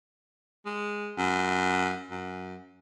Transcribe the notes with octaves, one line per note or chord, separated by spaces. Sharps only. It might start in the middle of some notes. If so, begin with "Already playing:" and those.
G#3
F#2
F#2